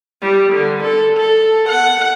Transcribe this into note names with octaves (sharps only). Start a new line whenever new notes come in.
G3
D3
A4
A4
F#5